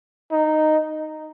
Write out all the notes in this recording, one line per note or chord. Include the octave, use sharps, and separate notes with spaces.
D#4